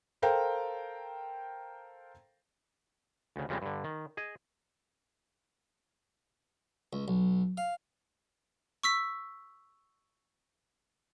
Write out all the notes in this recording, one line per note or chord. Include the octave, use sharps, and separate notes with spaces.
A4 A#4 C5 F5 G5 A#5
D2 C#3
F2 C#3 G3 G#3 C4
G2 D3
D#3
G#4 D#5 G#5
C#2
B1
F5
C#6 E6 B6